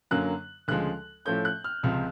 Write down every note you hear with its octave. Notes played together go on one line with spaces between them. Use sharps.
F#2 D3 F#3 A#3 F#6
D2 C#3 F3 G#3 F#6
A2 F3 A3 C#4 G6
F#6
F6
C#2 C3 F3 F6